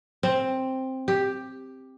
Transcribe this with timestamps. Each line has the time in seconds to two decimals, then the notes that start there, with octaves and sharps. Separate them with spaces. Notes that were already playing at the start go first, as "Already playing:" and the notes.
0.23 C4
1.08 G4